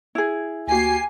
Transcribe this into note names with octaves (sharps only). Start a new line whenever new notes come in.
E4 G#4
D2 A#3 F#4 G4 G#5 C7